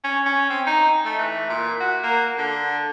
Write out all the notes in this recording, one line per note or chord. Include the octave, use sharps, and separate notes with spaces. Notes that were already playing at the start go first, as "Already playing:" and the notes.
C#4
C#4
C4
D#4
A3
E3
A#2
F#4
A#3
D3